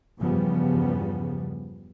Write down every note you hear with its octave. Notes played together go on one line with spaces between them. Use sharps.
E2 G2 C#3 F3 G3 B3